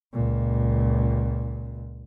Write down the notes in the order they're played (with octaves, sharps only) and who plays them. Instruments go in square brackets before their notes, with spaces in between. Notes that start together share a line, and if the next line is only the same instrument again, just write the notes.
[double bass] C#2 A#2